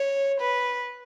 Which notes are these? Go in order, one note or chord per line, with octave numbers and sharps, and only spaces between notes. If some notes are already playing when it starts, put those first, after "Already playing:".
Already playing: C#5
B4